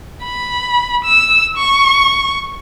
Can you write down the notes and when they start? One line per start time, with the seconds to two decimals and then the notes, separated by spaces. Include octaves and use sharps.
0.24 B5
1.05 E6
1.57 C#6